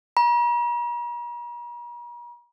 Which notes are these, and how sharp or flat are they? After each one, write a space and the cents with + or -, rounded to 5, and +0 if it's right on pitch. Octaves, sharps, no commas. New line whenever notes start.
A#5 +45